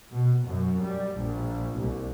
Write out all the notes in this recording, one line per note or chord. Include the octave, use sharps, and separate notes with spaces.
B2
F#2
G3
A#1
C2